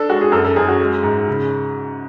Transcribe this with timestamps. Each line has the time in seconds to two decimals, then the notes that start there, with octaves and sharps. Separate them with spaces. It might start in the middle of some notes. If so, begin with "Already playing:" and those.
Already playing: D4 A4
0.09 G#3 F#4
0.21 G#4
0.32 F#2 A4
0.44 A4
0.56 F#2 G#4
0.68 F#4
0.81 G#3
1.03 G#2
1.28 C#3